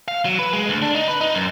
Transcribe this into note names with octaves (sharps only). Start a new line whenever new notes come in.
F5
F#3
B4
G#3
D2
D4
D#4
B4
D#4
F#2